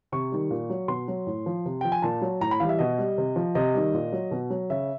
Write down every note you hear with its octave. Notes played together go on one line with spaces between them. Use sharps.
C3 C#6
D#3 G3
A#2
F#3
B2 C6
F#3
A2
F3
C3
F3 G5
G#5
A#2 A5
F#3
A2 A#5
B5
E3 G3 F5
E5
B2 D#5
G3
C3
F3
C3 D#5
D#3 G3
A#2
F#3
B2
F#3
C#3 E5